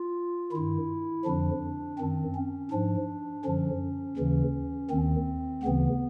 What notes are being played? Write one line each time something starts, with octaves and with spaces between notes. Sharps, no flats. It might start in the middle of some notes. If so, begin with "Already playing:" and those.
Already playing: F4
G2 D#3 E4
F2 D3 F3 D4
F#2 D#3 C4
C#4
G#2 F3 D4
F#2 D3 F3 C#4
D#2 C#3 E3
D#2 D#3 C4
D2 C#3 E3 B3